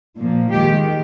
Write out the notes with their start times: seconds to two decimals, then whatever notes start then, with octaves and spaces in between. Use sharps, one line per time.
0.18 A#2 F3 A#3
0.50 D#3 G#3 G4